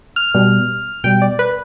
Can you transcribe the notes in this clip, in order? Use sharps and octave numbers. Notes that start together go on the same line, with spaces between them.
F6
B2 G3
B2 G3 G5
D5
B4